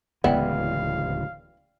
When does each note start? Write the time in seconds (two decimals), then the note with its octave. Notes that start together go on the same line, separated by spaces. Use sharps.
0.24 D1 C#2 E3 B3 E4 D5 F5 G5